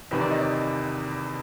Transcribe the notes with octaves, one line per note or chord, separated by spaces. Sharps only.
E2 C3 D#3 B4
D5
D#5
D5